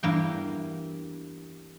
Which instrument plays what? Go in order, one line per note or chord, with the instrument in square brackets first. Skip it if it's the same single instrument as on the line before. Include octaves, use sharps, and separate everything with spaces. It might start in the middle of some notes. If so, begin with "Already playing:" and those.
[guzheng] E2 G2 A#3 G5